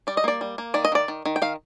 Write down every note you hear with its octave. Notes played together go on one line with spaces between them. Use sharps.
G3 D5
D#5
A#3 D5
G3
A#3
D#3 D5
D#5
D#3 D5
D#3
D#3
G5
D#3 F5